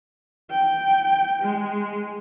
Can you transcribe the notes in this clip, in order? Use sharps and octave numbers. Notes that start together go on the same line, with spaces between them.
G5
G#3